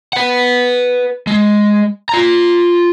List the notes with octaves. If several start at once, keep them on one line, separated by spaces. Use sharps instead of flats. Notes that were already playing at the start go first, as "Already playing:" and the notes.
B4 F#5
G#3
F4 A#5